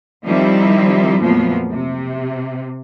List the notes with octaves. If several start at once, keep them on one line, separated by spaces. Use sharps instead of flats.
D#3 F3 G3 C4 D#4 E4
F2 A#2 F3 F#3 A3 B3
C3